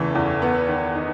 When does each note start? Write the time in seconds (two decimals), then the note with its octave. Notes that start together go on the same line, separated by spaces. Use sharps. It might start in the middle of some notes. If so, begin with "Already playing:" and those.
Already playing: E2 C#3 E3 A3
0.15 E2
0.42 B3
0.68 D#3
0.95 D#4